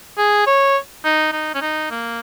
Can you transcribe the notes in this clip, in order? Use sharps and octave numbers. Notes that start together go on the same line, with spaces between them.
G#4
C#5
D#4
D#4
C#4
D#4
A#3